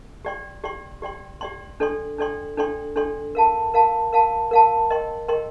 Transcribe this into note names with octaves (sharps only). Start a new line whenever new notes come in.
G4 D5 G5 C6
G4 D5 G5 C6
G4 D5 G5 C6
G4 D5 G5 C6
D4 A4 D5 G5 C6
D4 A4 D5 G5 C6
D4 A4 D5 G5 C6
D4 A4 D5 G5 C6
A#4 F5 A5
A#4 F5 A5
A#4 F5 A5
A#4 F5 A5
A#4 D#5 G5 C6
A#4 D#5 G5 C6